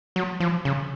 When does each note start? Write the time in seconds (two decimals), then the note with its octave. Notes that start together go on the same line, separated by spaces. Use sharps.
0.16 F#3
0.40 F3
0.65 C#3